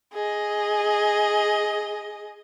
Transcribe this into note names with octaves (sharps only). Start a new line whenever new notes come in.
G#4 D#5